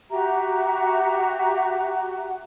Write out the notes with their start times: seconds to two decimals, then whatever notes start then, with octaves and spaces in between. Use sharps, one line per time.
0.10 F#4 G4 E5 A#5